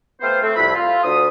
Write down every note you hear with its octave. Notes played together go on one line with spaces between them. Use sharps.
A3 B3 C4 F4 C5
A3 C4
C2 F2 A3 E4 B5
F4
D2 D#6